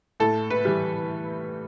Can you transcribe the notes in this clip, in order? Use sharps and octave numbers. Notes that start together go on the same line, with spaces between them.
A2 A4
B4
E3 G3